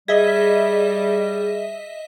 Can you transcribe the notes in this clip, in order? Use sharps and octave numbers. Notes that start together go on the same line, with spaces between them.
G3 G#4 D#5 E5 B6